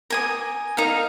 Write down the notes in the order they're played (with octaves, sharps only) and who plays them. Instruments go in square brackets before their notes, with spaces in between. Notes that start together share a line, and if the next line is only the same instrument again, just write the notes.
[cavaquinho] A#4 G#5 D#6
D#4 A#4 F5 A#5